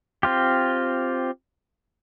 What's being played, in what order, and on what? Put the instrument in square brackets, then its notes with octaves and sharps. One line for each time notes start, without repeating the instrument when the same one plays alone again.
[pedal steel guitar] C4 F4 G4